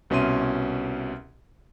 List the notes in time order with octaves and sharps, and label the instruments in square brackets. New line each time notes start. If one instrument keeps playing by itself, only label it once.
[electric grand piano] C2 B2 C#4 E5 C6 D#7